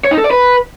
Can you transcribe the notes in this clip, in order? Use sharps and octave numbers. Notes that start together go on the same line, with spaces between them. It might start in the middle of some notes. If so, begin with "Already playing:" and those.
C#5
D#4
A4
D5
B4